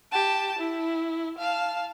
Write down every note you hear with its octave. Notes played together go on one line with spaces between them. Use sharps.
G4 A5
E4
F5 A5